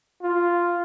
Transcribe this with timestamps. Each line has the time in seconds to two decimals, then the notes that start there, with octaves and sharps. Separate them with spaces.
0.22 F4